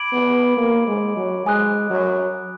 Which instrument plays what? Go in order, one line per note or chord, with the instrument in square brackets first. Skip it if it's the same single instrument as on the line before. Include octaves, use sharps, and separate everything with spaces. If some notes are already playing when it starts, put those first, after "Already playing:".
Already playing: [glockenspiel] B5 D6 G#6 D7 F#7
[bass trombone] B3
A#3
G#3
F#3
[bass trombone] G#3 [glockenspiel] G#5 D#6 F#6
[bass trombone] F#3